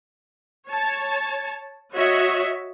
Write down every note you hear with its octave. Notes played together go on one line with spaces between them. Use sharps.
C#5 A5
F#4 C#5 D#5 E5